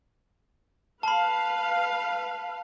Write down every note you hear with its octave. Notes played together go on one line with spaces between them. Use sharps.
B4 F5 A5 B5